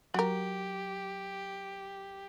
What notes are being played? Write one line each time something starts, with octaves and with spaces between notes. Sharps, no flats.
F#3 F#4 G4 A#4